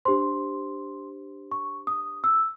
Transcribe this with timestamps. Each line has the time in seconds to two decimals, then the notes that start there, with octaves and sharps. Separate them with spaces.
0.05 D4 G4 C5 C6
1.52 C#6
1.87 D#6
2.24 E6